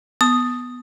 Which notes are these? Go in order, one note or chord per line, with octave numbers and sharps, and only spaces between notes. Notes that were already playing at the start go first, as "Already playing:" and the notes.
B3 D#6